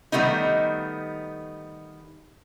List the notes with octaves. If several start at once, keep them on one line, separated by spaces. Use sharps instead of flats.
D#3 G3 A3 B3 D#4